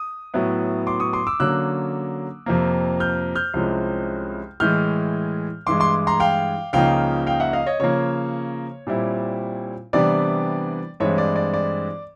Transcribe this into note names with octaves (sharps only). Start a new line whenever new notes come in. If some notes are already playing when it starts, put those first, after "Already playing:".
Already playing: D#6
A2 F#3 B3 E4
C6 D6
C#6 D#6
C6 D6
D6 E6
D3 F#3 A#3 C#4 E6 F#6
F2 C3 F3 A#3
F6 G6
F6 G6
C2 C3 F3 G#3 C#4
A2 E3 G#3 F6 G6
G2 E3 G#3 C6 D6
C6 D6
A#5 C6
F5 G5
C#2 C#3 F3 A#3 D#4 F5 G5
F5 G5
E5 F#5
D#5 F5
C#5 D#5
C#3 F3 A#3 C#5
A#2 G3 C4 E4
C3 E3 G3 B3 D4 D5
G2 E3 G#3 C4 C#5
D5
D5
D5